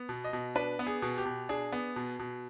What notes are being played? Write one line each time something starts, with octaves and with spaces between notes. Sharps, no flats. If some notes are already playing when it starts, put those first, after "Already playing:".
Already playing: B3
B2
D#5
B2
D4 B4
B3
G#4
B2
G4
B2
D4 G#4
B3
B2
B2